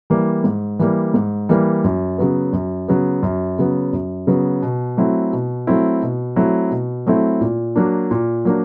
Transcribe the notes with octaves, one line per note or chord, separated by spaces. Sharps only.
E3 G3 A#3
G#2
E3 G3 A#3
G#2
E3 G3 A#3
F#2
C#3 F#3 B3
F#2
C#3 F#3 B3
F#2
C#3 F#3 B3
F#2
C#3 F#3 B3
B2
F#3 A3 C4 E4
B2
F#3 A3 C4 E4
B2
F#3 A3 C4 E4
B2
F#3 A3 C4 E4
A#2
F#3 A#3 D4
A#2
F#3 A#3 D4